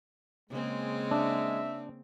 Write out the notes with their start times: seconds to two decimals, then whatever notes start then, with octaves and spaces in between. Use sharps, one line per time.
0.50 C#3 G#3 A#3 C4
1.11 D4 E5